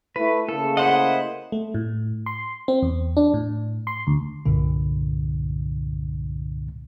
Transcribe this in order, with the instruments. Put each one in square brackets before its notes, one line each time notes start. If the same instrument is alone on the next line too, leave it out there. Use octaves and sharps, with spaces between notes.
[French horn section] A3 E4 [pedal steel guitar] B4
[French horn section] C#3 A3 A#3 [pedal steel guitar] A4
[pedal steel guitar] E4 C5 D#5 [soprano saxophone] F#5
[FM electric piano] A3
A2
C6
C4
E2
D4
A2
C6
D2
[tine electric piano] C2 G2 A#2 D3